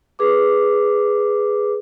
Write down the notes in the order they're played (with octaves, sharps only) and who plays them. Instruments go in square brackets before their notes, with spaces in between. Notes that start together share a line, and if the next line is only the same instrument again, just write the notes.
[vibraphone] G#4 B4 D6